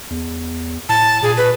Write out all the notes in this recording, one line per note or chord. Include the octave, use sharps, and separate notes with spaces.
E2
A2 A5
A#2 G#4
B4